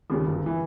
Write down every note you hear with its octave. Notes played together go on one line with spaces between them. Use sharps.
D#2 C#3 G3
G1
E3